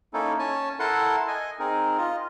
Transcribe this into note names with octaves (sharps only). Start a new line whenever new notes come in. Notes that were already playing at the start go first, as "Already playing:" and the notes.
A#3 C#4 D#4 E4 A4
C#4 C#5 G#5 A5
E4 A4 A#4 F#5 A5 C6
D#5 G#5
C4 D#4 G#4 A#4
F4 D#5